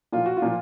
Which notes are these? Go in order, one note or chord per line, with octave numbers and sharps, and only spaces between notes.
A#2 F3 F4
F#4
F4
A#2 F3